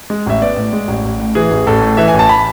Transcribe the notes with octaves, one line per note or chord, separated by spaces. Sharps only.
G#3
A1 E5
B3 D5
A2
G#3
A1
A1
A2
E3 G#4
A1
A1 A4
A2
E3 E5
G#5
A1
A5
B5